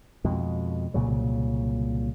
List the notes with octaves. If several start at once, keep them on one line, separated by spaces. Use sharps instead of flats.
F2 B2 G#3
C2 A#2 C#3 F#3